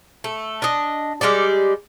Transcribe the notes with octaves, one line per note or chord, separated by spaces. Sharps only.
A3
D4 D#5
G3 G#3 G4 D5